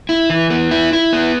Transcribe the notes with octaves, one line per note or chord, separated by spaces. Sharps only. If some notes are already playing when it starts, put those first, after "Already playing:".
E4
E3
B3
E4
E4
B3